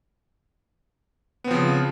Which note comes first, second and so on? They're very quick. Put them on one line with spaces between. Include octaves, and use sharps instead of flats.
B3 C4 F3 C#3